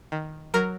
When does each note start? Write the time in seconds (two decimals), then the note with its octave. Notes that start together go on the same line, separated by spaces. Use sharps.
0.12 D#3
0.54 F#3 A#4